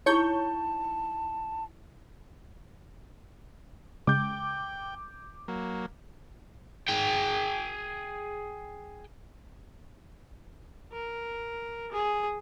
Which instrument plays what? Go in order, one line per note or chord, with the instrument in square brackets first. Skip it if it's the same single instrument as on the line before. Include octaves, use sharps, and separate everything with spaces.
[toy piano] D#4 E4 G#4 [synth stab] C#5 C#6 G6 [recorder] A5
[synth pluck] C#3 G#3 [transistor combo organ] G5 [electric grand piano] D6 G6
[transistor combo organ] F#3 A#3
[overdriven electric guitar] G#4 G5
[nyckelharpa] A#4
G#4